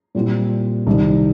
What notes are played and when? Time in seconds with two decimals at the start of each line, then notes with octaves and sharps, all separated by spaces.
0.15 A#2 G3 C4 E4
0.87 C2 C3 D#3